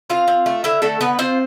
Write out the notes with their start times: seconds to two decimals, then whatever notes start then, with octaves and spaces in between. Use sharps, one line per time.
0.10 C4 F4 F5
0.28 C4
0.46 A3
0.64 D3 E4 E5
0.82 D3 A3 A4
1.01 D3 B3 B4
1.19 C4 F4 C5